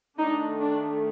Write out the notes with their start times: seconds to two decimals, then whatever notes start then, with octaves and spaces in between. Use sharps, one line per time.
0.18 D#3 A3 D4 D#4
0.59 D4